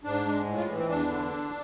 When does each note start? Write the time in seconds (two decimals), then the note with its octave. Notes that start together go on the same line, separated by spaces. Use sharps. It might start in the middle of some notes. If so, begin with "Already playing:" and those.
0.04 G#2 D4
0.26 G#3
0.46 A2
0.57 F4
0.68 E3
0.78 C4
0.88 E2 D4
1.09 D3